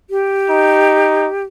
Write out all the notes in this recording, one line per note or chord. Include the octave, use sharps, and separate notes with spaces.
G4
D#4